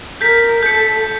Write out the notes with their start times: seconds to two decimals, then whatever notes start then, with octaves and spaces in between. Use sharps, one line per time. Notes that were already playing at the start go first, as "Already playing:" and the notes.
0.21 A#4 G6 B6
0.63 A4 G6 C#7